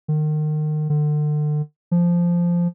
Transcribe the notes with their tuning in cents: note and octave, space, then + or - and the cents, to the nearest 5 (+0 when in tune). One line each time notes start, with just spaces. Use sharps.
D#3 -30
D3 +35
F3 -10